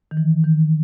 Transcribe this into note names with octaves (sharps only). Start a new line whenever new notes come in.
D#3
E3
D#3